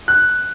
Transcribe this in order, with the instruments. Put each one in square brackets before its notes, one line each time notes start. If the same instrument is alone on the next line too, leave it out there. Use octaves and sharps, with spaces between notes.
[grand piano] F#6